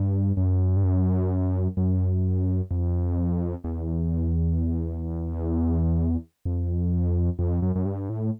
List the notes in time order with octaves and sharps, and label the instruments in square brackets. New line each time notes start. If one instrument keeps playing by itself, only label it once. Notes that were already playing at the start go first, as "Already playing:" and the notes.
Already playing: [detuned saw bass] G2
F#2
G2
F#2
F#2
F2
E2
F2
F2
F#2
F#2
G2
A2